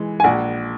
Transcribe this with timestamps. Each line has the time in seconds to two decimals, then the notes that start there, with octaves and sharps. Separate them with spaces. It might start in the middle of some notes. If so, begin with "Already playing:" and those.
Already playing: E3 G#3
0.20 G#5
0.24 A#1 F#5